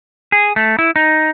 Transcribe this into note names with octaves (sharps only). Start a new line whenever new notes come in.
G#4
A3
E4
D#4